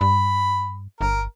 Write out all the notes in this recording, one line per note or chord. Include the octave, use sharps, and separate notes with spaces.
G2 B5
G1 A#4